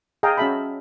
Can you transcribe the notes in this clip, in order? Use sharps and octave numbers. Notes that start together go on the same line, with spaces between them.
G#4 D#5 F5 G5 A#5
C#4 F#4 G#4 E5 A5 B5